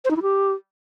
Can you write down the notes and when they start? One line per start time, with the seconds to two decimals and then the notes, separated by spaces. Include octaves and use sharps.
0.05 C5
0.11 D#4
0.16 E4
0.22 G4